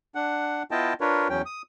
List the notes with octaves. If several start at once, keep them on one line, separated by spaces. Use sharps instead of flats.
D4 F#5
B3 E4 F4 D#5 G5 A5
D4 F4 A#4 B4 C#5
E2 F#3 C#4 G5
D#6